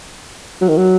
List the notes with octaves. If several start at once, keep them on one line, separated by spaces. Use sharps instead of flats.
F#3
D#3
F#3